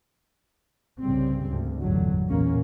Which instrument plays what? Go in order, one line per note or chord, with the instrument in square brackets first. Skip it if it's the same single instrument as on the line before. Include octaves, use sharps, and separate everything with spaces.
[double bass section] C2 G2 C#3 G3 C4
D2 G#2
G1 E2 A2 D3 F#3
B1 E2 A#2 A#3 C#4